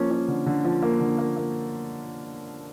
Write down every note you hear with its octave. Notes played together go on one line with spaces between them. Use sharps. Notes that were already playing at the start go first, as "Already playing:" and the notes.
Already playing: F3 A#3 C#4
C#4
D3
D3
F3
A#3
D3
A#3
A#3